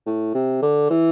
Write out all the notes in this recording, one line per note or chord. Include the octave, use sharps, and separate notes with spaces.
A2
C3
D3
E3